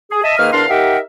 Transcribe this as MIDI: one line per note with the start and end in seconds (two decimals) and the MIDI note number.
0.11 0.21 68
0.24 0.35 75
0.24 0.35 76
0.24 0.35 81
0.38 0.51 51
0.38 0.51 58
0.38 0.51 68
0.38 0.51 71
0.38 0.51 89
0.53 0.66 40
0.53 0.66 62
0.53 0.66 70
0.53 0.66 77
0.53 0.66 84
0.69 0.98 63
0.69 0.98 67
0.69 0.98 70
0.69 0.98 76
0.69 0.98 78
0.69 0.98 79